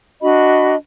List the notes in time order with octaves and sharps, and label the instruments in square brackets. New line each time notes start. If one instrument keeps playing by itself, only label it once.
[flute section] D4 F#4 D#5 B5